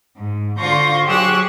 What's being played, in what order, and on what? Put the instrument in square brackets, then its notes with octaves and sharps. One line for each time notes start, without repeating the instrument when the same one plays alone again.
[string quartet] G#2
D3 F4 C5 C#6 G6 A#6
F#3 G4 G#4 C#6 E6 F#6